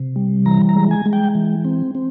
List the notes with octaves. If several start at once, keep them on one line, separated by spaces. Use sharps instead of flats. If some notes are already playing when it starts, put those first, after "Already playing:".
Already playing: C3
G3
E3 A#5
A#5
G#3
G#5
G#3
G5
E3
C4
C4